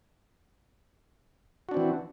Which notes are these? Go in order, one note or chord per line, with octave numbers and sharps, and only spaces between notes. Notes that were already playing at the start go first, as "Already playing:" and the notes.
E3 C4 D4 F#4